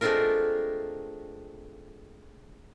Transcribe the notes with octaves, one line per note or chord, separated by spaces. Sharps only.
G#3 A3 C4 D4 F4 A#4